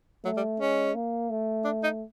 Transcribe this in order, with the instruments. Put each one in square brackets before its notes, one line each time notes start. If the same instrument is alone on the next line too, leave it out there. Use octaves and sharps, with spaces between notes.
[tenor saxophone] F#3 [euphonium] A3
[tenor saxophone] G3
[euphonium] G#3 [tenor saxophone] C#4
[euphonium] A#3
A3
[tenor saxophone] D4
D#4